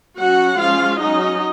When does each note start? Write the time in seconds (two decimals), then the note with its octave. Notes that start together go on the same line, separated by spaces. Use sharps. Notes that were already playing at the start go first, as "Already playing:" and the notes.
0.17 F#3 C#4 F#4 F#5
0.58 F3 G#3 C#4 F4 F5
0.99 F#3 C#4 D#4 D#5